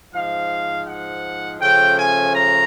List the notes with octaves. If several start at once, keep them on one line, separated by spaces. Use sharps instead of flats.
G#2 F3 G#3 F5
F#5
C#3 F3 A3 C#4 G5
G#5
A#5